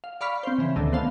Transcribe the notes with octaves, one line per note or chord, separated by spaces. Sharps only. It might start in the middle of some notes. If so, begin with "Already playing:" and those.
F5
D5 F5 B5 C#6 F6 B6
C4 C5
C#3 E3
D2 B2 D3 D#3 A3
B3 C5 F5 A5